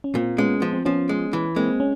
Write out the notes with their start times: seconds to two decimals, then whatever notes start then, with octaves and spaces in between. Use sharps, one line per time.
0.04 C#4
0.15 A#2 A#3 C4
0.38 G#3 B3 C#4
0.61 F3 B3
0.73 C4
0.85 F3 B3 C#4
1.09 G#3
1.33 E3
1.56 G#3 A#3 C4
1.80 C#4